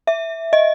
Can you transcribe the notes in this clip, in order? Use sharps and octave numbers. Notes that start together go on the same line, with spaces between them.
E5
D#5